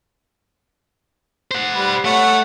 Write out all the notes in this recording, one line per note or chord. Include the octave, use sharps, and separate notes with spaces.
C5 F#5
G3 B4
A3 C#5 F#5